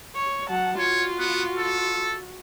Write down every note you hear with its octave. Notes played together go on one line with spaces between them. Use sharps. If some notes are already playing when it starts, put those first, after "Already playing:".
C#5
F#3 F#5 A5
F4 F#4 C#5
B3
A4